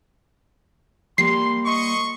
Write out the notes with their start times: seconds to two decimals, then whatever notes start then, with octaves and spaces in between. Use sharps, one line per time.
1.18 G3 A#3 C6 C7
1.65 D#5 C6 C#6